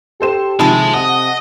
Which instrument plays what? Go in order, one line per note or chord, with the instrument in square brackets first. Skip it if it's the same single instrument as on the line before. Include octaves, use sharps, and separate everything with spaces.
[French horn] G4 [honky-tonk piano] A4 C5 E7
[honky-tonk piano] C3 D#3 F3 [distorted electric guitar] G#3 [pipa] E4 A4
[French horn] C3 [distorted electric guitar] D#5 [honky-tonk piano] F#5 D#6